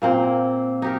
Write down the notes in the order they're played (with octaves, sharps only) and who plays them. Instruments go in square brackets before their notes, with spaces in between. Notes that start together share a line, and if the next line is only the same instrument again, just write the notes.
[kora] A#2 A#3 C4
D#4 G4 A#4